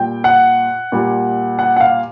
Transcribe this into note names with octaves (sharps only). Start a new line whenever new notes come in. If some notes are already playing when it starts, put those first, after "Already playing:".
Already playing: A#2 G3 G5
F#5
A#2 G3
F#5
F#5
F5